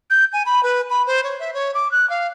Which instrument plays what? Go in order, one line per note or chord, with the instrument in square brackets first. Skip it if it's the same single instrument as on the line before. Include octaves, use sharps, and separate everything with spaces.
[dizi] G6
G#5
B5
B4
B5
C5
C#5
E5
C#5
D6
F#6
F5